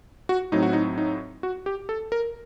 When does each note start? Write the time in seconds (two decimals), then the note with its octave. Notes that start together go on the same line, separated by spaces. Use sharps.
0.29 F#4
0.52 A2 F#3 C4 D#4
0.63 F#4
0.73 D#4
0.98 D#4
1.43 F#4
1.66 G4
1.89 A4
2.12 A#4